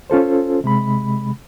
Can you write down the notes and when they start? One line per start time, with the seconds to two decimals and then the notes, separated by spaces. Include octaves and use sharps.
0.10 C#4 F4 A4 C5
0.64 C3 G#3 B5